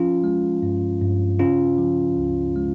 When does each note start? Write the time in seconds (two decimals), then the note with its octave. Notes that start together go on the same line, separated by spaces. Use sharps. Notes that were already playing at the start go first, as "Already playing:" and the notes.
Already playing: F3 C#4 F4
0.24 G#3
0.63 G2
1.01 G2
1.39 C#3 C#4 F4
1.78 F3
2.17 C#2
2.56 G#3